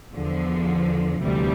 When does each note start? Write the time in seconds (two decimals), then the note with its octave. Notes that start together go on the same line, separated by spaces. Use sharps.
0.14 E2 D3 F3
1.22 D2 C3 E3 G3